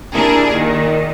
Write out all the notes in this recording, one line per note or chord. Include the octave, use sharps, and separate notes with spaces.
D4 E4 G4 G#4 A#4
A#2 D#3